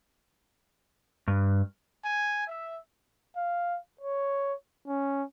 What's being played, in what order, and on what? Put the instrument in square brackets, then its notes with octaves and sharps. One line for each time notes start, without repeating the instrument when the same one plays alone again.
[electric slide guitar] G2
[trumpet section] G#5
E5
[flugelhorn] F5
C#5
C#4